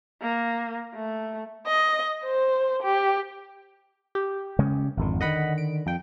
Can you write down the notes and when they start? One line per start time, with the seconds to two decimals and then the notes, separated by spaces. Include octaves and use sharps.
0.22 A#3
0.95 A3
1.65 D#5
2.24 C5
2.82 G4
4.15 G4
4.59 C#3 G#3 C#4
4.97 G#1 F2 D3
5.21 D3 D#3 D#5 F#5 B5
5.58 D7
5.86 F2 G5